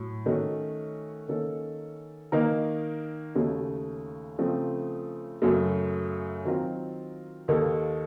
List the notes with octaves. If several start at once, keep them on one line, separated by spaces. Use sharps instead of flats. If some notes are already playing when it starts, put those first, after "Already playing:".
Already playing: A2 F#3
D#3 A3 C#4 F#4
D#3 A#3 C#4 A4
D#3 A#3 D#4 A#4
D#2 C#3 A3 C#4 F#4
C#3 F3 A3 C4
F#2 C#3 F#3 A3
D#3 F#3 C4 F4 A#4
D#2 D#3 A#3 D#4 A4